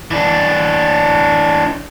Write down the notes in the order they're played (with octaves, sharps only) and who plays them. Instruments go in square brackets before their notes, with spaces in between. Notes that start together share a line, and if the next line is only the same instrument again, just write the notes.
[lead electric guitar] E3 D4